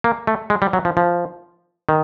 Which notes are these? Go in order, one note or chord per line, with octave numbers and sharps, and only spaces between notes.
A#3
A3
G#3
G3
F#3
F3
F3
D#3